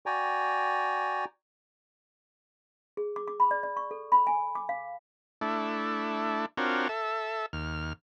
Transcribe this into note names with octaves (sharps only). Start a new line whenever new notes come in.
F#4 D5 G5 G#5 A#5
G#4
D6
D6
B5
D5
D5
C#6
A4
B5
G#5
D6
F5
A3 D4 E4
C4 D4 F4 F#4 A#4 C#5
A4 E5
D#2 F6